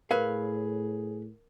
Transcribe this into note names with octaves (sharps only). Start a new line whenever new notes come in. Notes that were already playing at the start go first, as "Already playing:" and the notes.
A2 G#4 A#4 B4 C#5 F5